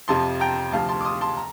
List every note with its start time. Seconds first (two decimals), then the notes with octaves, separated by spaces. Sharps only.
0.08 F2 C3 F3 A5 C6
0.40 G5 A#5
0.72 D2 C3 F3 F5 A5
0.89 A5 C6
1.00 D6
1.04 C6 D#6
1.21 A5 C6
1.36 A#5